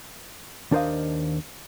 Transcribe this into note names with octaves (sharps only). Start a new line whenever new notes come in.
D#2 D4 A#4 C5 D#5 F5